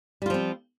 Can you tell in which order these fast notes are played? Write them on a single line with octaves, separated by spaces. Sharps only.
G3 F4 F3 C4